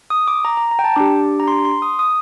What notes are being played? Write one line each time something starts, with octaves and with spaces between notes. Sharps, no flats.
D#6
D6
A#5
A#5
A#5
G5
A5
D4 G4 D6
A#5
C6
C6
D#6
D#6